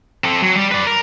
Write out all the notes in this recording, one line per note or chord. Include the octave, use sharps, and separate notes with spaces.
C4 A4
F#3
G3
B4 D5
A#4